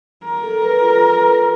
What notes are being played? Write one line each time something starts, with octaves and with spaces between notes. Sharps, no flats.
A#4
A4
B4
F4